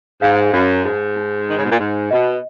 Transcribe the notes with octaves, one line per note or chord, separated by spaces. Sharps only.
G#2 F5
F#2 A#5
G#2 D#4
D#4
D#3 D#4
C#3
B2
A#2
G#2 G#4
B2 D#5